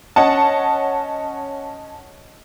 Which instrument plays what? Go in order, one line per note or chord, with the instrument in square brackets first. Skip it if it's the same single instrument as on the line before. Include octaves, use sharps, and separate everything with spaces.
[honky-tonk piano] C#4 C#5 D#5 F#5 A5